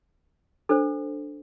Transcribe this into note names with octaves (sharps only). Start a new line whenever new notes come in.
D4 A4 C5